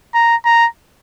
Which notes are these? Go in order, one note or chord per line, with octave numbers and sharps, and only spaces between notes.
A#5
A#5